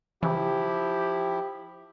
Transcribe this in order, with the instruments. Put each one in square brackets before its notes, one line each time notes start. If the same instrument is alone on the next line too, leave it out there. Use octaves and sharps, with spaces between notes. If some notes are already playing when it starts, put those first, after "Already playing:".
[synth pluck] C#3 E3 [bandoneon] F3 E4 [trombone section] G4